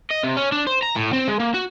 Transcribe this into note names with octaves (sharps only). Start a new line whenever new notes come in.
D#5
C3
C#4
D4
C5
A#5
A2
C4
G#3
A#3
F#4